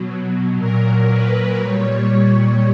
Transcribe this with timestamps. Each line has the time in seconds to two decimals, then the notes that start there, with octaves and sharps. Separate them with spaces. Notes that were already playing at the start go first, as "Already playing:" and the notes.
Already playing: B2 F#3
0.57 A#2 F#3 A#4
1.09 B4
1.60 A#2 G3 C#5